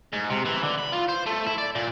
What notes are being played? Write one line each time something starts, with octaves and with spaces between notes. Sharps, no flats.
G#2
C3
E3
D3
B5
F4
C5
A3
E4
D5
A#2